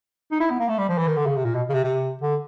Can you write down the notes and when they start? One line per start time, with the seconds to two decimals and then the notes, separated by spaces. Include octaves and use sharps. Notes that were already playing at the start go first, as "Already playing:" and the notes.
0.32 D#4
0.40 E4
0.50 B3
0.60 A#3
0.69 A3
0.78 G3
0.89 F3
0.98 E3
1.08 D#3
1.17 D3
1.26 C#3
1.36 C3
1.45 A#2
1.55 B2
1.69 C#3
1.74 C3
1.84 C3
2.22 D3